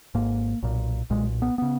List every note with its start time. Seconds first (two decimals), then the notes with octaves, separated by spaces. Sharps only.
0.15 G#1 G#2 A#3
0.63 B1 A#2
1.10 B1 A#2 G#3
1.42 B3
1.58 C#3 B3